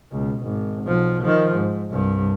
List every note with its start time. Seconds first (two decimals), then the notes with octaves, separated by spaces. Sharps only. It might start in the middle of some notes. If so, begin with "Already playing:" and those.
0.11 C#2 B2
0.43 G#1
0.83 B1 F3
1.23 D#3 F3
1.54 G#2
1.91 C2 G2